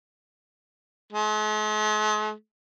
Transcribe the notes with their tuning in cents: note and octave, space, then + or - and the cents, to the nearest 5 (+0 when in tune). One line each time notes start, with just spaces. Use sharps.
G#3 +45